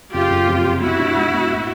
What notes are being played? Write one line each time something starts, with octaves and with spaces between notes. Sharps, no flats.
F#1 F4 G4
F#1
F2
C3
B2 E4 F#4
D4
G#3
B3
A2